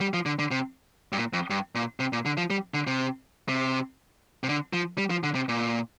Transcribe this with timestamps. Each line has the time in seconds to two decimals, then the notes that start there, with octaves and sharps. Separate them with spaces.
0.01 G3
0.14 F3
0.26 D3
0.39 D3
0.51 C3
1.12 G2
1.18 A#2
1.33 F2
1.50 G2
1.75 A#2
2.00 C3
2.13 A#2
2.25 D3
2.37 F3
2.50 G3
2.74 D3
2.87 C3
3.49 C3
4.43 C3
4.49 D3
4.73 F3
4.98 G3
5.10 F3
5.23 D3
5.35 C3
5.49 A#2